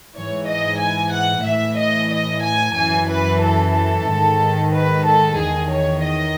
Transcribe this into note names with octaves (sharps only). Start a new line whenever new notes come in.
G#2 E3 C#5
D#5
G#5
F#5
A2 E3 E5
D#5
D#5
G#5
F#2 E3 G#5
B4
A4
A4
G#2 D#3
B4
A4
E2 D#3 G#4
C#5
D#5